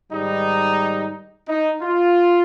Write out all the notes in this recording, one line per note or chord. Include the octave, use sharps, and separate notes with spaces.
G#2 D#3 G3 D#4
D#4
F4